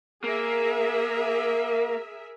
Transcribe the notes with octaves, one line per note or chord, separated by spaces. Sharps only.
A#3 G#4 A#4 E5